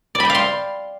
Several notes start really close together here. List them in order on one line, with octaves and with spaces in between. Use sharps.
D5 B5 G5 F5 C6